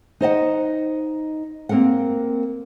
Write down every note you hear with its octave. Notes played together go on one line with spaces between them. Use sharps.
D#4 C5 D#5 F#5
A#3 C4 A#4 F5 F#5